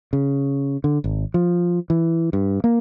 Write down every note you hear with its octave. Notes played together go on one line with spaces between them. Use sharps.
C#3
D3
G#1
F3
E3
G2
A#3